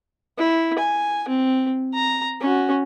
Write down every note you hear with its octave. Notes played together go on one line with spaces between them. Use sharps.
E4
G#5
C4
A#5
C#4 F#4